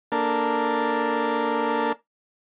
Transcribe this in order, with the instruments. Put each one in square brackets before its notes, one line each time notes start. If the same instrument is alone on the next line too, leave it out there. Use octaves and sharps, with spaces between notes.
[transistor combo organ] A#3 D4 A4 A#4